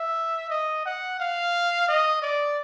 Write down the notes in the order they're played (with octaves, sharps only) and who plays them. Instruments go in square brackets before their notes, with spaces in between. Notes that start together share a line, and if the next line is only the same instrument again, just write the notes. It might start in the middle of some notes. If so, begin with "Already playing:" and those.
Already playing: [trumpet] E5
D#5
F#5
F5
D#5
D5